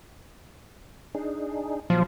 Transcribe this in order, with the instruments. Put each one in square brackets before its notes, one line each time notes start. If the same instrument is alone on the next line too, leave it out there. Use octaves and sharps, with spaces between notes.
[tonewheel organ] D4 D#4 G#4
[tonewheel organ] A#2 F#3 [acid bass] F3